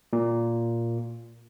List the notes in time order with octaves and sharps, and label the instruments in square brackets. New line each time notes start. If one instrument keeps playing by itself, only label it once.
[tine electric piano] A#2